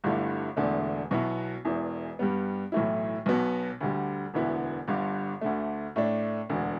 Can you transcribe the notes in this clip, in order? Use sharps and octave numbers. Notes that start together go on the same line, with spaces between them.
G1 G2 D3 A3 E4
E1 E2 D3 A3 D4
B1 B2 B3 E4
E1 E2 E3
G2 G3 B3
B1 A2 E3 A3 E4
B1 B2 B3
D2 D3 G3
E1 D2 D3 B3 E4
G1 G2 D3
D2 D3 A3
A2 A3 D4
E1 D2 D3